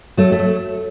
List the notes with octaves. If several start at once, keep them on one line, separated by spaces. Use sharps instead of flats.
F#3 A3
A3
F#3